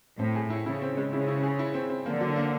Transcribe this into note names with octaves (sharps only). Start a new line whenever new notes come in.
A2 C4
G#4
E4
C#3 E4
C4
G#3
C#3 E4
E4
G#4
E4
C4
C4
D3 A#3
F#3
A#3